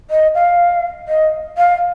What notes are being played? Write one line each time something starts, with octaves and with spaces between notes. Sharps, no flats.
D#5
F5
D#5
F5